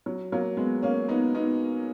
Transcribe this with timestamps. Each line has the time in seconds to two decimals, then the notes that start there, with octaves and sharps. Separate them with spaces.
0.06 F#3
0.32 F#3 A#3
0.57 G#3 B3
0.83 A#3 C#4
1.08 B3 D#4
1.35 B3 D#4